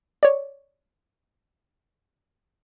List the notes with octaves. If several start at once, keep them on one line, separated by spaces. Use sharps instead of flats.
C#5 D5